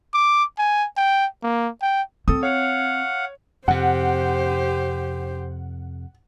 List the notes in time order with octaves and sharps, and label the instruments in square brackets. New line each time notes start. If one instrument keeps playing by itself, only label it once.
[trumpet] D6
G#5
G5
A#3
G5
[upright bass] C4 [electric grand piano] A4 D#6
[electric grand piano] C#5 [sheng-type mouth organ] F5 F#5
[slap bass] F2 C3 [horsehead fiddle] G4 C5 [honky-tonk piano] F#5